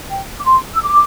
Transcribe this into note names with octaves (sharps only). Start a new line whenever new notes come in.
G5
D6
C6
E6
D6